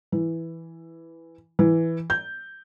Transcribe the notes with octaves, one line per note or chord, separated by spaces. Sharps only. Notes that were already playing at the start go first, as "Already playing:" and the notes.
E3
E3
G6